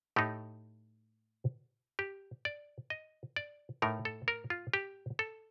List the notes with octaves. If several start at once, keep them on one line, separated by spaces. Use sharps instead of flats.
A2 A3 D#4 G4
G4
D5
D#5
D5
A2 A3 D#4 A#4
A4
A#4
F4
G4
A4